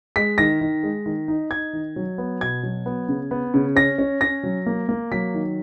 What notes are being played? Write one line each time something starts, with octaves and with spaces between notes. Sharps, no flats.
G#3 B6
D#3 A#6
D#3
G#3
D#3
D#4
D#4 G#6
D#3
F#3
B3
B2 G#6
F#3
B3
C#3
B3
C#3
C#4 A#6
C#4
C#4 A#6
F#3
A#3
A#3
F#3 B6
D#3